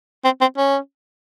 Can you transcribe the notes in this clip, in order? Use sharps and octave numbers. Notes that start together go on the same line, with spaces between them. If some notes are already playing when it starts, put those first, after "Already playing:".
C4
C4
C#4